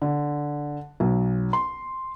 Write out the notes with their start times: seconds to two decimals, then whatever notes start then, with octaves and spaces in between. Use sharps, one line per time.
0.02 D3
1.00 B1
1.53 C6